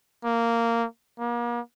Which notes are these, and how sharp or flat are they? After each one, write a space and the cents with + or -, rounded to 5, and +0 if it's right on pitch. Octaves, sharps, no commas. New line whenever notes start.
A#3 -10
A#3 +40